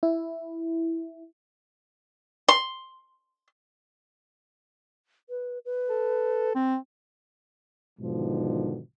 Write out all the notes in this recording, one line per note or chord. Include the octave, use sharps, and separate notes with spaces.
E4
C6
B4
B4
A4
C4
B1 G#2 B2 D3 D#3 F3